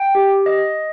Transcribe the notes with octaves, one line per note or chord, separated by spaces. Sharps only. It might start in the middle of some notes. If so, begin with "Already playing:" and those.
Already playing: G5
G4
D#5